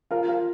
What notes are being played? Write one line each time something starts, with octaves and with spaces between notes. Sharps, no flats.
F4 A#4
F4 A#4